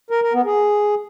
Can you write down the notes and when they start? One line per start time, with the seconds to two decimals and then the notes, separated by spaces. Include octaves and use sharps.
0.11 A#4
0.22 A#4
0.33 B3
0.45 G#4